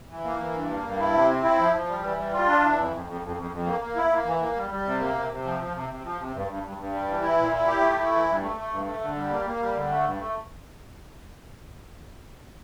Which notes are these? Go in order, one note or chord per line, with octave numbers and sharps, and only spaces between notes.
E3
A#3
E3
G2
A#3
G2
E4
C3
C4
E4
F3
F3
G3
E3
G3
F4
D4
E3
F2
F2
F2
F2
F2
F2
A#3
A#3
E4
A#3
E3
A#3
G3
G3
C3
A#3
C3
C3
F3
F3
C3
C3
F3
C3
G2
G2
G2
G2
G3
E3
E4
A#2
E4
G4
A3
E4
E3
G2
A3
A3
G2
A3
D3
G3
A#3
A#3
G3
D3
A3
G2
A3